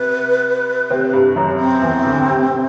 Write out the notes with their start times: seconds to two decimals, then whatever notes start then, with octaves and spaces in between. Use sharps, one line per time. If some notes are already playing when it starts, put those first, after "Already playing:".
Already playing: C3 B4
0.90 C3 C4
1.13 G2 G3
1.36 F#2 F#3
1.59 C4
1.82 E2 E3
2.04 D2 D3
2.28 C3
2.45 C3